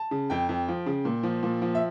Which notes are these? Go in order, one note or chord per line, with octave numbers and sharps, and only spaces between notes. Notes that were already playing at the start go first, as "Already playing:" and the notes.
Already playing: A5
C#3
F2 G5
F2
F3
C#3
A#2
F3
A#2
F3
E5